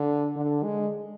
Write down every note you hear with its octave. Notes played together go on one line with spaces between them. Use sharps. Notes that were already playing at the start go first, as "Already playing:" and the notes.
Already playing: D3
D3
G#3